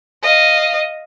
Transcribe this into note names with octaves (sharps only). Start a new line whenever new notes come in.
D#5 F5